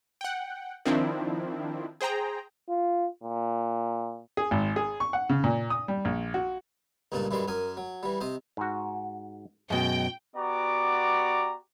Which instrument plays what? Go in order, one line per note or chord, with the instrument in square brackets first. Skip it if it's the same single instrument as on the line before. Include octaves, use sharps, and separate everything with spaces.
[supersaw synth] F#5 G5
D#3 F3 C4 D4 E4
G#4 C5 G5 A#5
[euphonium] F4
A#2
[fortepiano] G#4
G#1
G#4
C#6
F#5
C#3
A#2
D#6
G3
A#1
F#4
[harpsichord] C#2 G2 A#2 D4 D#4 A5
F#2 E3 G3 G#3 D5 C6
F#2 A#4 G#5 D#6
F#3
E3 G3
C3 C5 D#5
[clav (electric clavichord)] G#2 F#4
[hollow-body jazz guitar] F#2 B2 [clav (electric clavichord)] G#3 [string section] G5
[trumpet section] B3 F#4 G4 D5 A#5 D6